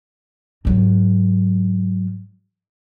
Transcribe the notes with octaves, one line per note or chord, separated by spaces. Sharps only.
G#2 F#3